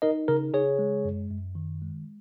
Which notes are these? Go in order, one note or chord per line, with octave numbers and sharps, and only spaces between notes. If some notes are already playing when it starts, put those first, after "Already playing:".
D#4 A#4 D#5
C#3 A#4
C#3 G#4 C#5
G#3
F#2
F#2
D#3
G#3